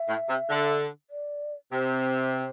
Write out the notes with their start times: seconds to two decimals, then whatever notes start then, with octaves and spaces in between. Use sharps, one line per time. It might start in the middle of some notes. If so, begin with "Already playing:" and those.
Already playing: E5
0.09 A2
0.29 C3
0.50 D3
1.10 D5
1.73 C3 C5